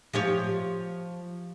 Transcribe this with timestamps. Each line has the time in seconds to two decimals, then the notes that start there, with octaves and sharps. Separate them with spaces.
0.13 F3 G4 C#5